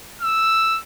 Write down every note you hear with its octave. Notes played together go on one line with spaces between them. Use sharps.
E6